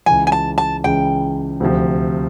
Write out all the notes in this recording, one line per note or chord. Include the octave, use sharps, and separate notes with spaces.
C#2 C#3 E3 G#5
G#5
A5
A5
C#2 C#3 E3 G5
D2 C3 F3